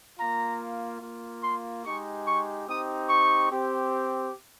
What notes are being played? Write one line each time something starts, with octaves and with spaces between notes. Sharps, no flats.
A#3 F4 A#5
A#3 F4
C6
G#3 D#4 G4 C#6
C#6
C4 D#4 G4 D#6
C#6
C4 G4